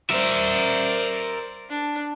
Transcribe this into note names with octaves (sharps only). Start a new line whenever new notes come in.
A#4 C5 D5 E5
D4